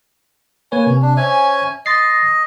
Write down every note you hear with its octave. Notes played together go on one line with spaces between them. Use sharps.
A#3 B4 C#5 G#5
C3 C#4
D4
C#4 C5 E5 G#5
D#5 C6 A6 C7